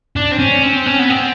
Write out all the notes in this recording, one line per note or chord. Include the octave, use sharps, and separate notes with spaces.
D4
C4
C#4
C4
C#4
B3
C4